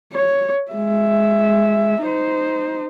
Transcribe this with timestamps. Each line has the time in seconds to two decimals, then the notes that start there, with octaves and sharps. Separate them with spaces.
0.13 C#5
0.72 G#3 E5
2.02 D#4 C5